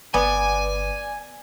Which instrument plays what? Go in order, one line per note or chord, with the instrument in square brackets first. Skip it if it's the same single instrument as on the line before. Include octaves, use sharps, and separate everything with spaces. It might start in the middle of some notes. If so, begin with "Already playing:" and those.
[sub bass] G1 [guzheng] B3 [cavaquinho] D5 [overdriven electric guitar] G#5